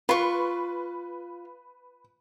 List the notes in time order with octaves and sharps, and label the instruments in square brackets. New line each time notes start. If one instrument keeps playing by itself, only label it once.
[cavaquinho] F4 C#6 [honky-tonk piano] B4